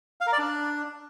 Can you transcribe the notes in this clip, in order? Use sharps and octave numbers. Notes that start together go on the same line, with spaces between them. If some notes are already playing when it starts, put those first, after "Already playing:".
F5
A#4
D5
D4